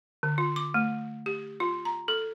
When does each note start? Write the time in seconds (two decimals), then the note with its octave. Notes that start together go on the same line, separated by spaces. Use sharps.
0.23 D3
0.38 F4
0.56 D6
0.74 A3
1.26 G4
1.60 F4
1.85 A#5
2.08 A4